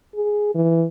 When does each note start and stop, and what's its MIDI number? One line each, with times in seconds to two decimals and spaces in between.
0.15 0.53 68
0.55 0.86 52